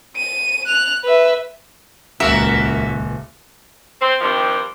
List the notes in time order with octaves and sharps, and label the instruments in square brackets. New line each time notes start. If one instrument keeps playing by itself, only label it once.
[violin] D#7
F#6 F7
B4 E5
[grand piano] D#1 E7 [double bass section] C#2 [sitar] A#3 F#4 A#4 [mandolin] E5
[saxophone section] C4
G2 D#3 F3 G3 C4